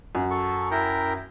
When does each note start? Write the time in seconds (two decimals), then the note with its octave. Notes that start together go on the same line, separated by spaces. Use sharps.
0.15 F#2 F#5
0.31 A4 C#6
0.71 E4 A#4 G5